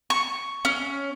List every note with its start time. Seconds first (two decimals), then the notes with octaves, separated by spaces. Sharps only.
0.10 C#6
0.65 C#4